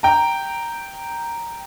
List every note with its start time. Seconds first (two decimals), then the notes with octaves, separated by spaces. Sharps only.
0.03 G5 A#5